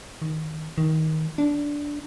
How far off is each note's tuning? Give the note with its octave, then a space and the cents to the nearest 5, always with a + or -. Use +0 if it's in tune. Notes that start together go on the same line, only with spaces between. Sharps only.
D#3 +10
D#3 +20
D4 -10